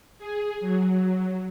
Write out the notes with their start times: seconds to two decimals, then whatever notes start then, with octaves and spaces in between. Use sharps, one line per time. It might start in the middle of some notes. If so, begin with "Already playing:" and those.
0.18 G#4
0.60 F#3